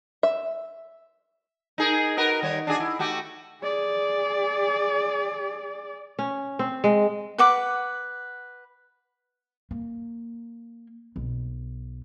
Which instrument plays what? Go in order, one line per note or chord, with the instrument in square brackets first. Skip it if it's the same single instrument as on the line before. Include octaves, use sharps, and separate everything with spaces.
[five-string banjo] E5
[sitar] D#4 G#4 A#4
F#4 A#4 B4
D#3 G3 C#5
D4 F#4 G#4
E4
A3 F#4 G4
[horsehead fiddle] G#4 D5
[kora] C#4
C4
G#3
[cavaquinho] B4 F#5 D6
[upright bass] A#3
B1